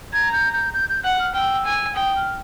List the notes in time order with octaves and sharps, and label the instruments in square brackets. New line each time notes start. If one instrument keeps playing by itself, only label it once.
[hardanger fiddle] A#5 [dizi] G#6
[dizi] G6
G6
G6
G6
[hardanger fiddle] F#5 [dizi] F#6
[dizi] F6
[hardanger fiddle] G5 [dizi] E6 F6
[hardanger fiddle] G#5
[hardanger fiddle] G5 [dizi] D#6
[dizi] F6